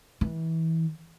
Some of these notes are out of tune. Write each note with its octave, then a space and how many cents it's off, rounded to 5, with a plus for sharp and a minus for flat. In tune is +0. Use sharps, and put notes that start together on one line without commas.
E3 -25